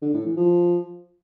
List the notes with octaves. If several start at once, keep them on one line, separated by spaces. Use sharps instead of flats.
D3
A2
E3
F3